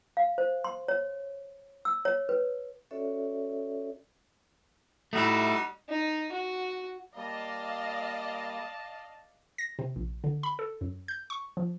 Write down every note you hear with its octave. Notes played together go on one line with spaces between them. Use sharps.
F5
C5
C6
C#5
E6
C#5
B4
C#4 F#4 A4 C#5 D5 E5
G3 A3 D#4 E4 F#4
D#4
F#4
G3 A#3 D5 D#5 F5 A5
A#6
C3
A#1
D3
B5
A4
F#2
G6
C#6
F3